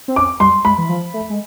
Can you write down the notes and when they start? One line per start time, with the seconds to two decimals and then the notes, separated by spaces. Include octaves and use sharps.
0.08 C4
0.16 C#4 D6
0.40 G3 C6
0.65 G#3 B5
0.78 E3
0.89 F3
1.14 A3
1.30 G#3